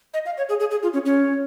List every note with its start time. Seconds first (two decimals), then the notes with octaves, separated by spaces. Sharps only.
0.14 D#5
0.26 F5
0.38 C#5
0.49 G#4
0.60 G#4
0.71 G#4
0.83 F4
0.93 C#4
1.06 C#4